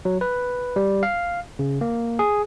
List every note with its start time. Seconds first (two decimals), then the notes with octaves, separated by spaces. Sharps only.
0.05 F#3
0.21 B4
0.76 G3
1.03 F5
1.59 C#3
1.81 A#3
2.19 G#4